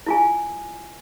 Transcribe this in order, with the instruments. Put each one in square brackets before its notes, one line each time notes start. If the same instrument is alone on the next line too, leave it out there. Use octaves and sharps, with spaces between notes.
[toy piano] E4 F4 G#5